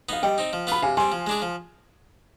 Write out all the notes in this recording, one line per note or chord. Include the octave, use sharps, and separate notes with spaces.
B3 D#4 F5
G3 D#5 G5
C4 D#4
F3
B3 F4 B4 B5
C3 F5 G#5
G3 C4 G#5 C6
F3
G#3 D4 G#4
F3